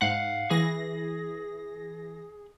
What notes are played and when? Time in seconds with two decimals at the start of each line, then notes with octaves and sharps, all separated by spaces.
0.02 G#2 F5 F#5
0.50 E3 G#4 A#6